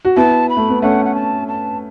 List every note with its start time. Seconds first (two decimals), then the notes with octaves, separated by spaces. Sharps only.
0.05 F#4
0.16 B3 E4 A5
0.49 B5
0.57 A3
0.69 B3
0.82 A3 C#4 F#5
1.05 F#5
1.15 A5
1.48 A5